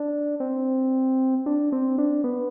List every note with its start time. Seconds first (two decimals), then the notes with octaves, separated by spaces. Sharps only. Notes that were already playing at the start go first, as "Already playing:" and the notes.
Already playing: D4
0.40 C4
1.46 D4
1.72 C4
1.98 D4
2.24 B3